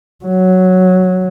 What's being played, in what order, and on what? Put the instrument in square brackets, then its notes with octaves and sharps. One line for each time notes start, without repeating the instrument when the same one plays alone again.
[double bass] F#3